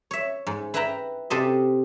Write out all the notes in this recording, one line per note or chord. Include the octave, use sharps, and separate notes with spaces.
C#5 E5
G#2
E4 B4 E5 G5 A#5 B5
C3 G4 A4 C5 D#5